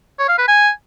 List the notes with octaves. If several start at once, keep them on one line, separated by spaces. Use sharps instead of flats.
C#5
F5
B4
G#5